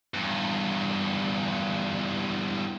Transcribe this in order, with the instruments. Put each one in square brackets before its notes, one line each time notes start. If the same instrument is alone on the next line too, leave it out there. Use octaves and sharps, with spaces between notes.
[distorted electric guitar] E2 G2